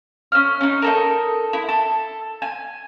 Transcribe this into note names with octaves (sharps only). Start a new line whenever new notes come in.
C#4 F6
C#4 D#4
D#4 A4 A#4
E4
A4
G#5